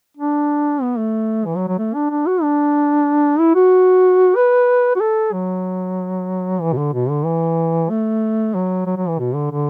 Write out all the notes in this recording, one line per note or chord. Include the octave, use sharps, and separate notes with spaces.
D4
B3
A3
E3
F#3
F#3
A3
D4
D4
F#4
D4
E4
F#4
B4
F#4
A4
F#3
E3
B2
D3
B2
D3
E3
A3
F#3
F#3
F#3
E3
B2
D3
D3